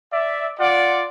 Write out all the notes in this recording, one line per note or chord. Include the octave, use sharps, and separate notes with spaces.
D5 E5
F4 D5 F#5